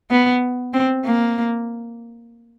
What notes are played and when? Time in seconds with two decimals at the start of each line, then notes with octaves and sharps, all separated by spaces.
0.11 B3
0.73 C4
1.05 A#3